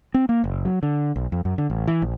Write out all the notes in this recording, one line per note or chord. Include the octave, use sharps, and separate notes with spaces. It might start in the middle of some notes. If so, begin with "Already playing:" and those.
C4
A#3
F#1
F#3
D3
B1
F2
F#2
D3
A1
E3
A#1